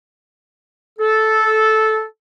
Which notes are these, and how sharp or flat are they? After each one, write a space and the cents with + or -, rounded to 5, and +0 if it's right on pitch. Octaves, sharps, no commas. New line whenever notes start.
A4 -10